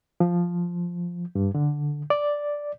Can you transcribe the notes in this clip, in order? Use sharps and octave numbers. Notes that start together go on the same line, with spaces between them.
F3
G2
D3
D5